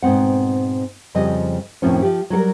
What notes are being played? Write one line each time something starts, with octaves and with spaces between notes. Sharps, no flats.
G#2 B2 C4 F#5
F2 C#3 F3 G3 D#5
F2 A2 D#3 F3 C4 C#4
F3 G4
F#3 G3 A4 A#4